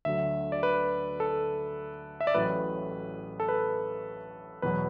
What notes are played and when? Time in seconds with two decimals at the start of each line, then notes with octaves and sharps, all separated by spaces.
0.05 D2 D3 F#3 E5
0.52 D5
0.63 B4
1.20 A4
2.21 E5
2.27 D5
2.34 A1 A2 F#3 B4
3.40 A4
3.49 B4
4.62 E2 B2 F#3 B4